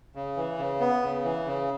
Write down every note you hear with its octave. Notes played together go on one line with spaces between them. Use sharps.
C#3
E3
C#3
B3
C#3
E3
C#3